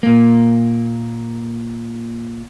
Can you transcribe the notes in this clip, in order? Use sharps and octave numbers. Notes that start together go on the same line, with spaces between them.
A#2 A#3